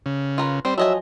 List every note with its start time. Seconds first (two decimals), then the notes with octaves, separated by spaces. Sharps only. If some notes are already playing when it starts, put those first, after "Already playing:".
0.06 C#3
0.38 F4 A#4 B4
0.65 G3 C4 C5
0.78 F3 F#3 D#5 E5 G#5